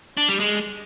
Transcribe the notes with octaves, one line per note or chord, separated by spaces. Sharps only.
D4
G3
G#3